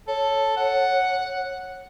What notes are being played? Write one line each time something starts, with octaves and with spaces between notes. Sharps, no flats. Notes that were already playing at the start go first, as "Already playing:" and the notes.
A4 C#5
F#5